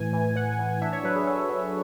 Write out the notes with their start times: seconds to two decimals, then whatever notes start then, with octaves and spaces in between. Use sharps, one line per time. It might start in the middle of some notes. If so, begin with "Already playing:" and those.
Already playing: A2 E3 G#5
0.13 E3
0.36 E3 F#5
0.59 E3
0.82 D4 E5
0.93 C#5
1.04 F#3 B4
1.16 G#4
1.27 F#3 A4
1.50 F#3